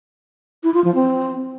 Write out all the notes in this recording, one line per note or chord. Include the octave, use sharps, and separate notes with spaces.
E4
F4
F3
C4